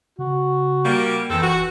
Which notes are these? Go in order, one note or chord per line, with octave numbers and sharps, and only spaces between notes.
C#3 F#4
G3 A#3
F2 D#3 E3 C4 A4
E1 F#4